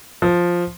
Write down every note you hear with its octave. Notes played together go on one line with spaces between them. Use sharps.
F3